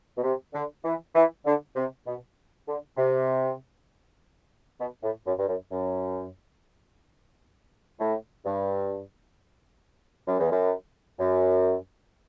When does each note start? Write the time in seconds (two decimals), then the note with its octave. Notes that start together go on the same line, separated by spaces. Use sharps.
0.16 B2
0.23 C3
0.53 D3
0.84 E3
1.15 E3
1.45 D3
1.75 C3
2.06 B2
2.67 D3
2.97 C3
4.79 B2
5.03 A2
5.25 F#2
5.38 G2
5.48 F#2
5.71 F#2
7.99 A2
8.45 G2
10.27 F#2
10.39 E2
10.51 F#2
11.19 F#2